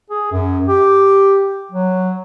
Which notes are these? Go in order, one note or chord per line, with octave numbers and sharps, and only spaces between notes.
G#4
F#2
G4
F#3